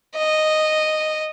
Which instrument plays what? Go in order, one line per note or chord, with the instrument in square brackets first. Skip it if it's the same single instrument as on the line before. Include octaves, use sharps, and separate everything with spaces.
[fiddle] D#5